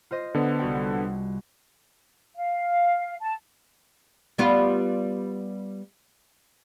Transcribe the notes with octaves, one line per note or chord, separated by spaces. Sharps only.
F4 C5 D#5
D3 B3
C2 F#4 G5
F5
A5
G3 B3 F4